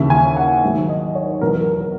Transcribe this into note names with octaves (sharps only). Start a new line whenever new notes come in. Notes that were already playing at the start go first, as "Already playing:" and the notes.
Already playing: D#2 C#3 E3 E5
G#5
F#5
G#2 D#3 F#3
D#5
C#5
E2 B2 F#3 B3 A#4
A#4
A#4